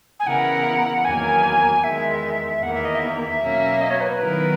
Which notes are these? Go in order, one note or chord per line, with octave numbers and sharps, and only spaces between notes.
G#5
C#3 E3 B3 E4 A#4 F#5
E2 D#3 F#3 A#3 G#5
E2 D#3 G#3 E5
E2 D#3 A#3 F#5
E5
D#5
E5
B2 F#3 A#3 C#4
D#5
C#5
B4
B4
D#3 F#3 B3 E4 A#4